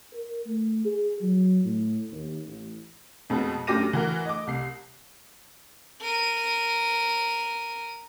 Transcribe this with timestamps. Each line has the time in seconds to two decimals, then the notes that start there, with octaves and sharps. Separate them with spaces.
0.12 A#4
0.46 A3
0.85 G#4
1.21 F#3
1.65 A2
2.11 D#2
2.46 A1
3.30 F2 B2 G#3 B3
3.67 F#2 D4 G4 D6 A#6 D#7
3.93 E3 F#4 A#4
4.25 D#5 D6
4.47 C2 C7
6.02 A#4 D#7